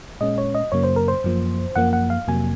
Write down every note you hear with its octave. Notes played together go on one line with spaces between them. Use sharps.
A#2 G#3 C#4 D#5
C#5
D#5
F#2 C#3 F#3 A#3 C#5
C5
A#4
C5
F#2 F3 A#3
F#2 F3 A#3 F#5
F#5
F5
F2 C3 F#3 A#3 G#5